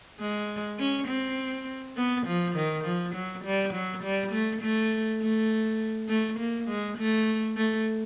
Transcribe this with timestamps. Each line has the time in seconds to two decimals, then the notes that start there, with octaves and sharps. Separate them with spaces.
0.20 G#3
0.79 C#4
1.08 C4
1.97 B3
2.27 F3
2.55 D#3
2.85 F3
3.15 F#3
3.44 G3
3.74 F#3
4.03 G3
4.32 A3
4.62 A3
5.21 A3
6.09 A3
6.39 A#3
6.68 G#3
6.98 A3
7.57 A3